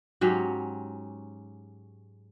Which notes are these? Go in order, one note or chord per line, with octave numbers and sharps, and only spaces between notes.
G#2 F#3 C#4 G4